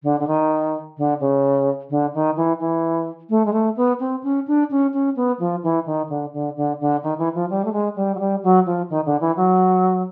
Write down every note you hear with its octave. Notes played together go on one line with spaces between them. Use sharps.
D3
D3
D#3
D3
C#3
D3
D#3
E3
E3
A3
G#3
A3
B3
C4
C#4
D4
C#4
C#4
B3
F3
E3
D#3
D3
D3
D3
D3
D#3
E3
F3
G3
A3
G#3
G3
F#3
G3
F#3
F3
D#3
D3
E3
F#3